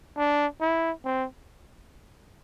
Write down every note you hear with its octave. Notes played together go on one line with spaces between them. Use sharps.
D4
E4
C4